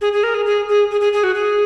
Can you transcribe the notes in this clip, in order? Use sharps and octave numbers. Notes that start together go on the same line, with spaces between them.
G#4
G#4
A#4
G#4
G#4
G#4
G#4
G#4
G#4
F#4
G#4